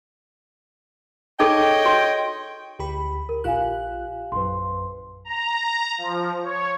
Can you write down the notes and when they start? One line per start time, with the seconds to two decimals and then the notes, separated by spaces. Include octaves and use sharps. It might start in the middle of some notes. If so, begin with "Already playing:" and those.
1.40 D#4 G#4 A4 C#5 D#5 G5
1.86 F#4
2.79 D2 G4 B5
3.29 A#4
3.44 A#1 F4 G4 F5 G#5 F#6
4.32 A#1 F#2 B4 C6
5.25 A#5
5.98 F3
6.43 C#5